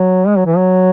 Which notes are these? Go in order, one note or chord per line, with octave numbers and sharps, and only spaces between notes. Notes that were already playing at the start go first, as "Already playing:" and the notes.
Already playing: F#3
G#3
F#3
E3
F#3